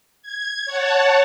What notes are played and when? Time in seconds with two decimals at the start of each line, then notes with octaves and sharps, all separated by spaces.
0.23 G#6
0.65 C#5 F#5 A5